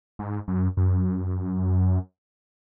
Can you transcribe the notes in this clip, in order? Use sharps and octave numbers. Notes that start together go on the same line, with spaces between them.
G#2
F#2
F#2